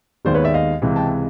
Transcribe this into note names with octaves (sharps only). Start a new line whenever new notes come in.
D#2 D#3 G#3 B3 C5 D5
B4 C#5
D5 E5
D#5 F5
C#2 C3 E3 G#3
G5 A5